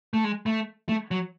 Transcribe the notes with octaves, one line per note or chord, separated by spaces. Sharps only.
A3
G#3
A3
A3
F#3